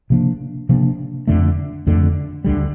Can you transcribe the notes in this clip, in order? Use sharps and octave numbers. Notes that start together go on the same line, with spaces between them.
C3 F3 A#3 D4
C3 F3 A#3 D4
F2 D3 A3
F2 D3 A3
D2 D3 G3